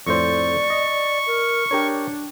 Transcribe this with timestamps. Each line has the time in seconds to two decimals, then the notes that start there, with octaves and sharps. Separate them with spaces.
0.07 F2 A2 C5 D5 C#6
0.70 D#5
1.27 A#4
1.71 D4 G4 A#4 C#5